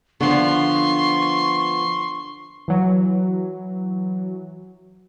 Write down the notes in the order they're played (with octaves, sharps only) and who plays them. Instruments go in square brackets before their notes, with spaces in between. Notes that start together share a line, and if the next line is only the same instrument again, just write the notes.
[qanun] D3 [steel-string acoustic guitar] F3 B3 [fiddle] C6 [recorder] C#6
[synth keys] E3 F#3